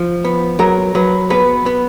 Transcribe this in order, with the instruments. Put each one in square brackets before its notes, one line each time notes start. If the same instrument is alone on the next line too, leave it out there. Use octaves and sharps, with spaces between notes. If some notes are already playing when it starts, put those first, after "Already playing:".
Already playing: [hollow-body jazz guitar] F3
B3
[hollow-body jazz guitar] F#3 [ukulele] A#4
[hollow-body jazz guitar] F#3 [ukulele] B4
[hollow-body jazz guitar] B3 [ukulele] B4
[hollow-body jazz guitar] B3